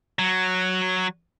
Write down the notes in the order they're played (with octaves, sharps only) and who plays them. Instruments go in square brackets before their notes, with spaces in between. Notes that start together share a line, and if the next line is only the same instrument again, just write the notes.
[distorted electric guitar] F#3